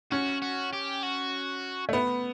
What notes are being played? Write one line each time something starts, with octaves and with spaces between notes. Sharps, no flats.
C#4 F#4
F#4
G4
F#4
A3
B3